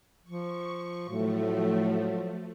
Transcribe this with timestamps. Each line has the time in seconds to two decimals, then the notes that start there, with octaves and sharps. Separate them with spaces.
0.24 F3 C#6
1.09 A2 F3 F#3 A3